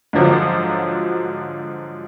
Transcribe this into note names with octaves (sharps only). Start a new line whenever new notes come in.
G#2 D3 F3 F#3